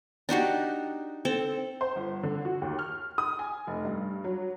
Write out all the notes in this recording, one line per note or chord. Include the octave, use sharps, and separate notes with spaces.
D4 D#4 F#4 G4
C4 A4
C5
G1
D3
F#4
D#2
F6
D#6
G#5
F1
G2
F#3